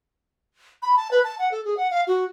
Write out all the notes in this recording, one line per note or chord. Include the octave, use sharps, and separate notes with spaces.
B5
A5
B4
A5
F#5
A4
G#4
F#5
F5
F#4